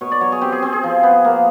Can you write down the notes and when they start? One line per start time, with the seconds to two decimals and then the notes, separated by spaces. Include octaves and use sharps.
0.01 B2 C#5
0.12 D5
0.21 F#3 C#5
0.32 G#4
0.41 C4 G4
0.52 G#4
0.62 C4
0.73 G#4
0.83 F3
1.03 B3
1.25 A#3